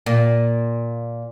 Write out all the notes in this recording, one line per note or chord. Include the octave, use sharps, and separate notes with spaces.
A#2